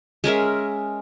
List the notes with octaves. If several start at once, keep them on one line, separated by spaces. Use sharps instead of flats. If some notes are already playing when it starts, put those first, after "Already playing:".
G#3 C#4 A#4 E5